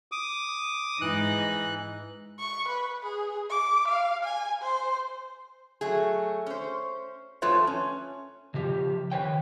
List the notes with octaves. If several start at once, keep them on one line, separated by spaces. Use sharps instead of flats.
D6 D#6
G#2 E3 D#4 F#6
C#6
B4
G#4
D6
F5
G#5
C5
F#3 A3 G#4
C#4 C5
F2 A3 F4 B4 C#5
C#4
C#3 F3 G4
D#3 B4 C#5 G5